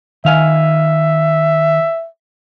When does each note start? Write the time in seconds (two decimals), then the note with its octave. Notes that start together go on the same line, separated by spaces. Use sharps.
0.25 D#3 E5 F5 G#5